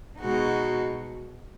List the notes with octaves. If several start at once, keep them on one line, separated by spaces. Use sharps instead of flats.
B2 G#3 D#4 F#4